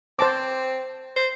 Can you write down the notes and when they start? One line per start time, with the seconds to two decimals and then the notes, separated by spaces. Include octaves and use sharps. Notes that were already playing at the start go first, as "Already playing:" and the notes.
0.19 C4 C5 A5 D6
1.16 C5